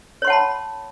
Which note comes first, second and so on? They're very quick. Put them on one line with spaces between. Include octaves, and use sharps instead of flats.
C#5 C6 F#5 A5 B5